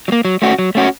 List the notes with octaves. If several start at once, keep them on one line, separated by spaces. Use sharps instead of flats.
F#3
A#3
F#3
A3 C#4 F#4
F#3
A3 C#4 F#4